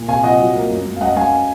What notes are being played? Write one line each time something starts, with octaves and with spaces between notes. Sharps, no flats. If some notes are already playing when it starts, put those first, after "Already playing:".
Already playing: A#2
C3 F5 G#5
F3 D#5 F#5
F#3
A#3
F#2
F#2
F5
F#2 D#5 F#5
F#2 F5 G#5